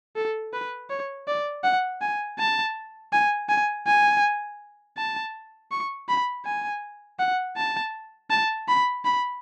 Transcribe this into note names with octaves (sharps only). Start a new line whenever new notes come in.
A4
B4
C#5
D5
F#5
G#5
A5
G#5
G#5
G#5
A5
C#6
B5
G#5
F#5
A5
A5
B5
B5